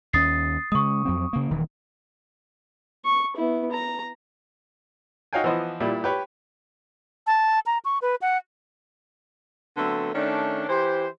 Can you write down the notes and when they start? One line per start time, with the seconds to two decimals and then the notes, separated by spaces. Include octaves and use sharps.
0.13 D#2 C#4 D#6 A6 C7
0.72 C#3 G#3 C#6 D#6
1.05 F2 F#3 C4
1.33 C#3 A#3
1.50 D#1 D#3 E3
3.05 C#6
3.37 B3 E4
3.72 A#5
5.33 D#4 F#4 C#5 F5 G5 G#5
5.44 E3 F3 B3 C5 D#5
5.80 A#2 G3 E4 G4
6.04 G4 B4 C#5
7.27 A5
7.66 A#5
7.85 C#6
8.02 B4
8.22 F#5
9.77 D3 F#3 A3 B3 C4
10.14 D#3 A3 C#4 D4
10.69 E3 G4 C5